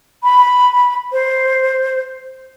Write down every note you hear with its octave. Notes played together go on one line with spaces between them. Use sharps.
B5
C5